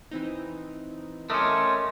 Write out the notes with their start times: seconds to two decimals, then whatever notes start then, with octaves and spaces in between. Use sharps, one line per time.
0.11 E3 C4 D#4
1.30 A3 C#4 A#4 D#5 C6 D6